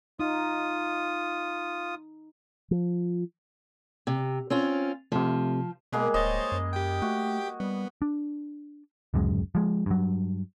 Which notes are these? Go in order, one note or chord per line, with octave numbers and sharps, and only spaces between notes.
D#4 F4 D#6
F3
C3
C4 C#4 F4
C3 F3 A3
B2 G3 G#3 A#3
D1 C5 C#5 D#5 A6
F#2
G4 G5
A3 F#4
G3 B3
D4
D1 C#2 F#2 G#3
F3 G#3
G2 F#3